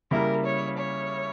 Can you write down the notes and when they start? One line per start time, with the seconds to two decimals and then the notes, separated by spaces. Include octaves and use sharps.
0.11 C#3 G3 A#3 E4 A#4
0.44 C#5
0.76 C#5